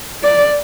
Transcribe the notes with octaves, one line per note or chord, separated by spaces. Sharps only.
D5